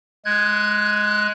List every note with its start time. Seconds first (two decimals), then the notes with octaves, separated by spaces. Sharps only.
0.25 G#3 F#6 G#6